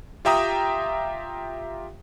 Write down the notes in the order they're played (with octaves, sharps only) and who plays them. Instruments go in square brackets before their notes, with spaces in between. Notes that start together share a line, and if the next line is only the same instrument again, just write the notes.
[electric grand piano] F4 G4 E5 G5 A#5 D#6